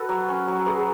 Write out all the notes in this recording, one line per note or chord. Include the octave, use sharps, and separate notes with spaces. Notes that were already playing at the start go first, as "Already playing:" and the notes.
Already playing: F#4 A4 B4
F#3
C#4
F#3
F#3 G#4 B4